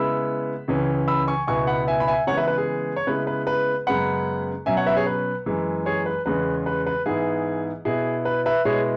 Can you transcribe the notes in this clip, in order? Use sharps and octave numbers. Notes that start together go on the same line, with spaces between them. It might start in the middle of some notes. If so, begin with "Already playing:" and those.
Already playing: C#3 G#3 B3 E4 B5 E6
C#2 C#3 E3 C#4
B5 E6
G#5 C#6
C#2 B2 B3 E4 G#5 C#6
F#5 B5
E5 G#5
B5
E5 G#5
C#3 E3 G#3 B3 C#5 F#5
B4 E5
B4
G#4
C#5
C#3 G#3 B3 E4 B4
B4
B4
F#2 C#3 G#3 B3 F#5 B5
B2 F#3 C#4 E5 G#5
C#5 F#5
B4 E5
G#4 C#5
B4
F#2 E3 G#3
G#4 C#5
B4
E2 C#3 G#3 C#4 B4
B4
B4
G#2 E3 B3 E4 G#4
B2 B3 E4 G#4
B4
B4 E5
B2 G#3 B3 E4 G#4 C#5